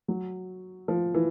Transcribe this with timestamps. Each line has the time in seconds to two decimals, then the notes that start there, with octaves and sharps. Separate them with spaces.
0.08 F#3
0.88 F3
1.14 E3